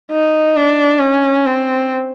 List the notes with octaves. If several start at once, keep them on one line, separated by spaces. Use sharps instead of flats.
D#4
D4
C#4
C4